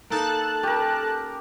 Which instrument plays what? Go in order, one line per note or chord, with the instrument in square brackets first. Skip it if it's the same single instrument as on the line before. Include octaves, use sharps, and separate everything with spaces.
[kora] A#3 D#4 [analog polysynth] A4 A5 F#6
[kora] C#4 [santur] G4 A#4